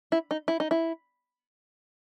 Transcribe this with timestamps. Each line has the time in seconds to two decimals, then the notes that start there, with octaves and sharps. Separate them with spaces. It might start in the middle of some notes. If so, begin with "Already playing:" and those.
0.12 E4
0.31 D#4
0.48 E4
0.60 D#4
0.71 E4